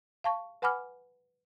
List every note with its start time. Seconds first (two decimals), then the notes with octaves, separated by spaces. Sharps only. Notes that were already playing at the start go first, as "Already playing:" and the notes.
0.24 F5 A5 C#6
0.62 B4 F#5 G#5 B5 D6 F6